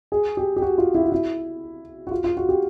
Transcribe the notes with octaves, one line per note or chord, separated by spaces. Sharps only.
G#4
G4
G4
F#4
F4
E4
F4
E4
F#4
F4
F4
F#4
G4